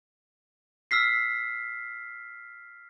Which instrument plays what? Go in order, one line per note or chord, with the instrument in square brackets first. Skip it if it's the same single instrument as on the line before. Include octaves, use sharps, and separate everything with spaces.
[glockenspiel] E6 F6 B6 C7